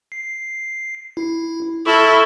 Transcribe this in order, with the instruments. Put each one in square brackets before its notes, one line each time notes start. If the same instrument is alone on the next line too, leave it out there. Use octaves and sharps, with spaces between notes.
[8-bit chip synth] C7
E4
[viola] E4 A4 [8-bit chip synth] C#6 F6 A#6